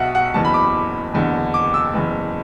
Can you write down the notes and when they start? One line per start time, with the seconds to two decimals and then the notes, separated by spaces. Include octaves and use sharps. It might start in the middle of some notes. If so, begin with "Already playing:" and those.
Already playing: B1 B2 E5 F#5
0.15 F#5
0.34 F#1 E2 E3 A5
0.45 B5
0.54 D6
1.14 F#1 E2 D3
1.54 D6
1.74 E6
1.94 F#1 E2 E3